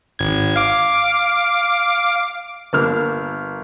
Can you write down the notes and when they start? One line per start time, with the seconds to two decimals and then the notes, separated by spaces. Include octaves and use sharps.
0.19 G#1 G#6
0.56 F5 D6
2.73 G1 A#3 E6 F6